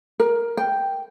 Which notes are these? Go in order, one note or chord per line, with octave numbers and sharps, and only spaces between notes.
A#4
G5